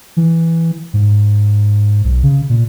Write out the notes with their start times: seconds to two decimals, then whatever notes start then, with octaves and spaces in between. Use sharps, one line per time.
0.17 E3
0.93 G#2
2.04 B1
2.23 C#3
2.49 A#2